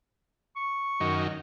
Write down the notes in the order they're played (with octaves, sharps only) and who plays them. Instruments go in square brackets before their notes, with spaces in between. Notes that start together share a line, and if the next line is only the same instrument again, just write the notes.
[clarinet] C#6
[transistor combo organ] F#2 D#3